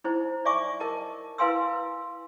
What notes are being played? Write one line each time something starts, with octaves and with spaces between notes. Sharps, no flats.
D#4 E4 C5
D5 E5 G#5 C#6 D6
A#4 D#5 A5
E4 B4 F5 G#5 C6 E6